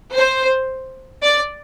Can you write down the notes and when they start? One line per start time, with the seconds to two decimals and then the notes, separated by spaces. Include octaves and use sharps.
0.15 C5
1.23 D5